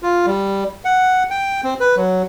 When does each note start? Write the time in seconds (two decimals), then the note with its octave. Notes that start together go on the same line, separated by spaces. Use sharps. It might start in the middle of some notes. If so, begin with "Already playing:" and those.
0.03 F4
0.26 G3
0.85 F#5
1.30 G5
1.64 C4
1.80 B4
1.97 F#3